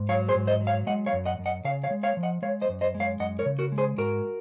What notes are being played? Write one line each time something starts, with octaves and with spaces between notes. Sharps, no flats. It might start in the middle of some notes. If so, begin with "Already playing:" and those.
Already playing: G#2
F#3 C#5 F5
G#4 C5
G#2
C5 D#5
F#3
C#5 F5
G#3 D#5 F#5
C#5 F5
F#2
D#5 F#5
F#2
D#5 F#5
C#3 C#5 F5
C#5 F5
G#3
C#5 F5
F3
D#5 F#5
G#3 C#5 F5
C5 D#5
F#2
C5 D#5
G#3
C#5 F5
F#2 D#5 F#5
A#4 C#5
C#3
F#4 A#4
G#3
G#4 C5
G#2 F#4 A#4